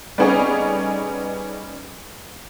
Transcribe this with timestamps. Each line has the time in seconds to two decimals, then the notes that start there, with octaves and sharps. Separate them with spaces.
0.18 G3 A3 B3 C#4 D#4 G#4